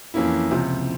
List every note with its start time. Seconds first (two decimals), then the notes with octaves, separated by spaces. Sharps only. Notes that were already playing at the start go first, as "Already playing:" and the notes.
0.14 F2 E3 A#3 C#4 E4
0.51 C#2 C3 F3